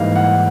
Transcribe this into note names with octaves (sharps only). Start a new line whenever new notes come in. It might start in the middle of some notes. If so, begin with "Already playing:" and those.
Already playing: G#2 E3 G3 A#3 D#4 F5
F#5